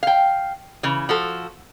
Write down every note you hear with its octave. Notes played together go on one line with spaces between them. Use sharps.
F5 G5
C#3 E3
F3 F#4 A4